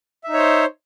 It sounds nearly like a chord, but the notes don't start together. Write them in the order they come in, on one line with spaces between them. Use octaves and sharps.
E5 D#4 C#5 C5